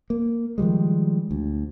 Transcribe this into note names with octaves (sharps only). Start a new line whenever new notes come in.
A#3
D#3 F3 G3 G#3
D2